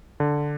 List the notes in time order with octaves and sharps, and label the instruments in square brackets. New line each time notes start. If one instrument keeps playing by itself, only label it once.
[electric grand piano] D3